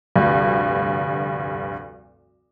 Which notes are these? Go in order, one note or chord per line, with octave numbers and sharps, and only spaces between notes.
F1 D2 G2